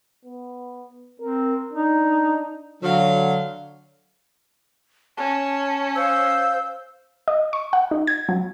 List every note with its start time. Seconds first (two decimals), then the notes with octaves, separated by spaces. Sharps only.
0.25 B3
1.20 C4 A#4
1.73 D4 D#4
2.83 D3 F#3 F5
5.17 C#4 A5
5.95 C5 F5 E6 G6
7.28 D#5
7.53 C#6
7.73 F#5
7.91 D#4
8.07 G#6
8.29 F#3